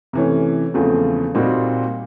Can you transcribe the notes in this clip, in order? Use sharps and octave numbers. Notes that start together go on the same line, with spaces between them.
C3 E3 A3 C#4
E2 C#3 F3 A3 C4
A#2 G3 C4 D#4 F#4